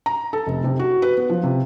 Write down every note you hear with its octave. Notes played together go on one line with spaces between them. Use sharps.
A#5
A4
F1
C3
F#4
B4
B3
F3
C3